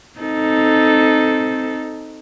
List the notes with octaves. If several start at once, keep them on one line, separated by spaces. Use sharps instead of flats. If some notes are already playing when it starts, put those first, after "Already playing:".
C4 D#4 A4